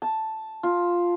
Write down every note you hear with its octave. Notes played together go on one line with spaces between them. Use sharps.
A5
F4